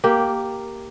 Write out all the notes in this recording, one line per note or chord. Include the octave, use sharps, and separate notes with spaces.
A#3 G4